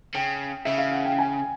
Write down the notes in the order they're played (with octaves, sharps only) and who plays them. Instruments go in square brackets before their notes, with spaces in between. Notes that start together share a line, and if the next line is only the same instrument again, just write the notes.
[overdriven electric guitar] C#3 [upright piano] G5
[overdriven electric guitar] C#3 [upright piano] E5
[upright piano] F5
F#5
G5
G#5